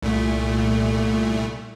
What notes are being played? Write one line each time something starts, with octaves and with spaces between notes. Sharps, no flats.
C2 A#2 A3